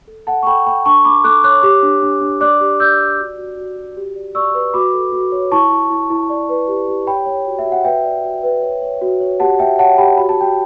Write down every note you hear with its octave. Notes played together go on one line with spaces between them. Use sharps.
A4
A4 F#5 A5
C#6
A4 G5 B5
A4 G5 B5
D4 A5 C#6
D4 B5 D6
A4 D6 F#6
C#5 D6 F#6
G4 D6 F#6
D4
D4
D4
D5 D6 F#6
G4
D5 E6 G6
D5
F#4
F#4
F#4
F#4
G4
D5
D5 C#6 E6
B4
F#4 B5 D6
A4
F#4
C#5
E4 A5 C#6
E4
E4
E4
D5
B4
G4
G4
C#5 G5 B5
C#5
F#4
E5
F#4
F#5
B4 E5 G5
D5
F#4
B4
C#5
C#5
F#4
C#5
G4 F#5 A5
G4 E5 G5
C#5 F#5 A5
G4 G5 B5
F#4 B5
A5
F#4 G5